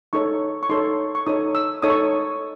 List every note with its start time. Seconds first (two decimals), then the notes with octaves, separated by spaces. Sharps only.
0.13 D#4 A4 C#5 C#6
0.63 C#6
0.69 D#4 A4 C#5 C6
1.15 C#6
1.26 D#4 A4 C#5 D#6
1.55 E6
1.82 D#4 A4 C#5 D#6
1.90 C#6